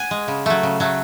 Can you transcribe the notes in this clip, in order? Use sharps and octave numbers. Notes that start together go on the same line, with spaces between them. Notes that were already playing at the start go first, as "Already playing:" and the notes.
Already playing: F#5 G#5
G#3
C#3
F#3 A3
C#3
F#3 A3